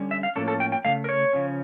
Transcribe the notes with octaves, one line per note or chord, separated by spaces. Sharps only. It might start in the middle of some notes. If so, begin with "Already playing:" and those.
Already playing: D3 G3 C#4
E5
F5
A2 F3 A#3 C#4 A4
A4
G5
G5
C#3 E3 A3 F5
A#4
C#5
C#3 F3 C#4